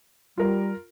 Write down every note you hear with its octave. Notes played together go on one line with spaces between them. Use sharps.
G3 F4 A#4